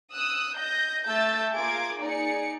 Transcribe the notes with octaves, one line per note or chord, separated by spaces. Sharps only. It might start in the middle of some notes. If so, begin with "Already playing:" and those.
D#6 E6 F#6
D#5 G6 A#6
A3 E5 A5 E6 G6 A6
A#3 F4 G#4 D6 G#6
D#4 G#4 D5 C#7